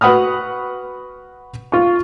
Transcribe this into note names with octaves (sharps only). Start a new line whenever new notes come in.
F#4 B4 F#5 B5 D#6 F6
F4 C#6